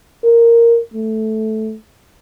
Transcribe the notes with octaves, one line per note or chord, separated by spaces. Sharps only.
A#4
A3